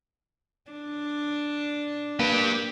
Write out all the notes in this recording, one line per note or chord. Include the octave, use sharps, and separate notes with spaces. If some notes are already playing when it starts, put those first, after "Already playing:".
D4
A#3 G4 B4